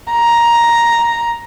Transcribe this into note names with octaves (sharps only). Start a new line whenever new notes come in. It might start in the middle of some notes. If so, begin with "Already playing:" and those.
A#5